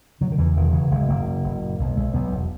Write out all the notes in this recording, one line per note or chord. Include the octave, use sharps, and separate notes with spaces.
C#3 F#3
D#3
E2 E3
E1 D#3
C#3 E3
F#1 G#3
F#1 A#3
C#3
F#1
A#2
B1
B1 G#3
B1 B3
E1